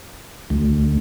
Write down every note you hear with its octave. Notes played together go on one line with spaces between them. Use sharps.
D2